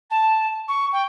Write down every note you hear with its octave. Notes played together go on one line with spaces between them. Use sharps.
A5
C#6
G5